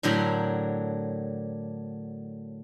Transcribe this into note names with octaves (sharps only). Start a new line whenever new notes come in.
A2 D3 F#3 A#4 G5 B5